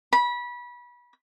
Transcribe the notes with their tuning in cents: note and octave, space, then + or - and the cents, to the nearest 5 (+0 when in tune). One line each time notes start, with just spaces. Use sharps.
B5 -25